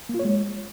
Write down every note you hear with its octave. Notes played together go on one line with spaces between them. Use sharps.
A#3
F4
C#5
G#3